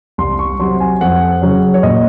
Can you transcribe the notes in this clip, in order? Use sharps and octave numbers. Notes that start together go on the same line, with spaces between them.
C2 C6
C#6
C3 F#3 C6
G#5
F2 F#5
C#3 F#3 C#4
C#5
A#2 D#5